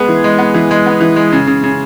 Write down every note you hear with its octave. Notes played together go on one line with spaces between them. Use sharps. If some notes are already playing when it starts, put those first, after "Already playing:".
Already playing: G#3 B3 G#4
E3
G#3
B3
E3
G#3
B3
E3
G#3
C#3
C#3
C#3